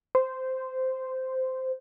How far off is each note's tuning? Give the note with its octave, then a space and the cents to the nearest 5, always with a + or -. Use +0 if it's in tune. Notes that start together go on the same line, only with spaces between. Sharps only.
C5 -10